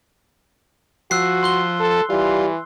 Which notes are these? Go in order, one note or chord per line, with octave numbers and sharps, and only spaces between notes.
F3 F#4 E6 F#6 C7
C6 F#6 G7
A4
E3 G3 F4